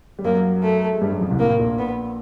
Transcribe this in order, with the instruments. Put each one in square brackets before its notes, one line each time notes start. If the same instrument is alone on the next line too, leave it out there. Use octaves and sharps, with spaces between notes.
[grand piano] G3
[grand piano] F#2 F#3 [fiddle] A#3
[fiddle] A3
[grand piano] G#3
G2 G3
F#2 F#3
F2 F3
C2 C3
[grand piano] A2 [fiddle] A#3
[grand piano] A#1 A#2
[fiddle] B3